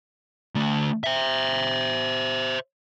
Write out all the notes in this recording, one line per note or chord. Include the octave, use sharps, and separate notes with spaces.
D3 A3
C5 E5